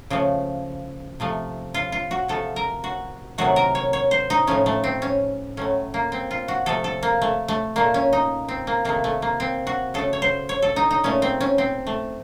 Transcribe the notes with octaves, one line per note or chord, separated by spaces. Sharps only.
C#3 F3 A3
C3 F3 A3
F4
F4
F#4
C3 F3 A3 A4
A#4
F#4
C3 D#3 F#3 A3 F#4
A#4
C#5
C#5
C5
D#4
A2 F3 A3 C#4
A3
C4
C#4
A2 F#3 A3 C#4
A#3
C4
F4
F#4
C3 F3 A3 A4
A4
A#3
A3
A3
A#2 A3 A#3
C#4
D#4
C4
A#3
C3 D#3 A3 A#3
A3
A#3
C4
F#4
C#3 A3 A4
C#5
C5
C#5
A4
D#4
D#4
A#2 A3 C#4
C4
C#4
C4
A3